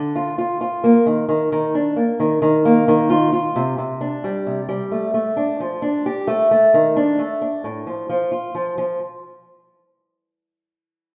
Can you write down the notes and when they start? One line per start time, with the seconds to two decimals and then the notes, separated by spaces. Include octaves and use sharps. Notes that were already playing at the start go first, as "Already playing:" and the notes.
Already playing: D3
0.16 F4
0.38 F4
0.61 F4
0.84 A#3
1.06 D#3
1.29 D#3
1.52 D#3
1.75 D4
1.96 A#3
2.20 D#3
2.42 D#3
2.65 A#3
2.88 D#3
3.10 F4
3.33 F4
3.56 C3
3.78 C3
4.01 D4
4.24 G3
4.47 C3
4.69 G3
4.92 A3
5.14 A3
5.37 D4
5.60 F3
5.82 D4
6.06 G4
6.28 A3
6.51 A3
6.74 D#3
6.96 D4
7.19 A3
7.41 D4
7.64 A2
7.87 F3
8.09 F3
8.32 F4
8.55 F3
8.78 F3